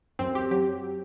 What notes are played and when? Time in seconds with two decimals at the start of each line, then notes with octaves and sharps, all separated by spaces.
0.19 F#2 C4
0.35 F#2 G4
0.51 F#3 G4